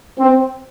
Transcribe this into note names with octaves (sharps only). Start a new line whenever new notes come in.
C4